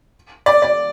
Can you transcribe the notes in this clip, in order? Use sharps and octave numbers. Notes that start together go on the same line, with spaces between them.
D5
D5